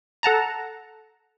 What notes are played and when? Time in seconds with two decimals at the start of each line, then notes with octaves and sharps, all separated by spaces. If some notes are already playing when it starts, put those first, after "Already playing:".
0.23 A4 F#5 A5 A#5